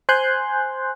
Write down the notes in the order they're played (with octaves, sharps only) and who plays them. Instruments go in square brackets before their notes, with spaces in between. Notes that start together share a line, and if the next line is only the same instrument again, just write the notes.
[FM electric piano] C5 G#5 C6 F#6 G6